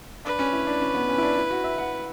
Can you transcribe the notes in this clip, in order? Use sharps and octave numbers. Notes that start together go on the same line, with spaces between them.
D4 B4
C#4
E4
D4
C#4
B3
C#4
E4
D4
E4
F#4
E5
F#5